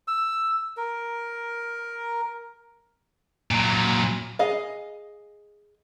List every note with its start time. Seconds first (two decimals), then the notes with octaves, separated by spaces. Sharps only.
0.08 E6
0.77 A#4
3.51 A#2 F#3
4.39 G#4 D#5 F5